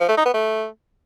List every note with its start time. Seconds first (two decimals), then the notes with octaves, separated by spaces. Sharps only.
0.01 F3
0.09 A3
0.17 D#4
0.26 B3
0.34 A3